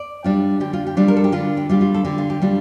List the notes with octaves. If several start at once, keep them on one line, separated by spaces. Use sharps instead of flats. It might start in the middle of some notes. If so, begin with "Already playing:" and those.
Already playing: D5
G3 D4 F4
D3 G4
F4
G4
G3 D4 F4
A#4
A4
G4
D3 F4
G4
G3 D4 F4
F4
A4
D3 G4
F4
G4
G3 D4 F4